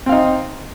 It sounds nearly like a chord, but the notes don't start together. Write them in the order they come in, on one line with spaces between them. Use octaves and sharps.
C4 F5 D#4